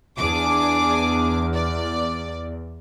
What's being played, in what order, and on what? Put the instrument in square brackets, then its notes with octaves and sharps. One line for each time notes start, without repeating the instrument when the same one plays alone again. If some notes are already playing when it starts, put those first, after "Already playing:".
[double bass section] E2 [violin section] D4 G#4 D6
[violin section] D5